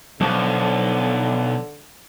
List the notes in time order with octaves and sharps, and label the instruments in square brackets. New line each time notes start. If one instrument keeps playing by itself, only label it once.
[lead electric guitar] B1 [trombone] D3 [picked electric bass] F3